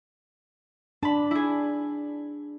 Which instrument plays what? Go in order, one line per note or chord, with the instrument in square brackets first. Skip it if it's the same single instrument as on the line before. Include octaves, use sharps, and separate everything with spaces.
[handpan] D4 [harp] A5 B5
[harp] E4 G#4